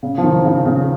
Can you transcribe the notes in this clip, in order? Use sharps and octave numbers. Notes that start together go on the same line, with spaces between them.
C#3
F3
D#3
C#3
C#3